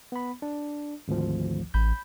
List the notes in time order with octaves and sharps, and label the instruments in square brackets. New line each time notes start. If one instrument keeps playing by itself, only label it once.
[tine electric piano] B3 B5
D4
G#1 D2 F3
[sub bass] A1 [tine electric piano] B5 G6